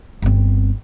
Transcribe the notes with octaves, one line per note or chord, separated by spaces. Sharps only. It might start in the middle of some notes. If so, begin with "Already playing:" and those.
G1 C4